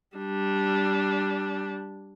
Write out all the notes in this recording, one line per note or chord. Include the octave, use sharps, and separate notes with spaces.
G3 D4